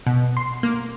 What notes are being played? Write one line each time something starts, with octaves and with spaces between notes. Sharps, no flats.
B2
C6
A#3